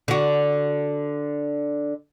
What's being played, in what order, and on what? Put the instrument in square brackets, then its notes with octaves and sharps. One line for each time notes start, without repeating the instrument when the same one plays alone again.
[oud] D3 F#4